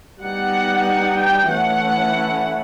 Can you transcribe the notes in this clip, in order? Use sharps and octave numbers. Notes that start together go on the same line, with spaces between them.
G3 B3 D#4 F#5
G5
E3 A3 C#4 E4 F#5